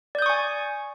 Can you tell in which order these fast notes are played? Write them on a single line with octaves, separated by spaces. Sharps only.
D5 G6 D#6 C#6 G#5